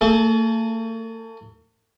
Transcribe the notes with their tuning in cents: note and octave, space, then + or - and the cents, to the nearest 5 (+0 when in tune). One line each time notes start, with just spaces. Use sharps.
A3 +45 A4 -35